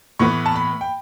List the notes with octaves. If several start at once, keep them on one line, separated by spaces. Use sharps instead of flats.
A2 E3 B3 C#6
A5
B5
G5